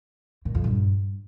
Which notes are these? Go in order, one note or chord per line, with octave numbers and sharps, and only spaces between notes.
A#2
F2
G2